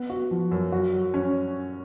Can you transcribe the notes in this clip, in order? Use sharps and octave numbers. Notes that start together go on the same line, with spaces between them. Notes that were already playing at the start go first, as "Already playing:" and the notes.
Already playing: B3
F#4
F3
F#2
F#4
F#3
C#4